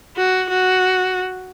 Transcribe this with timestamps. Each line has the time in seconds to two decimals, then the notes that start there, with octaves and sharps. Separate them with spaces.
0.17 F#4
0.49 F#4